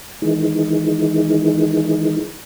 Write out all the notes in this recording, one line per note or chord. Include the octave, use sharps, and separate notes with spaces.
D#3 E3 G#3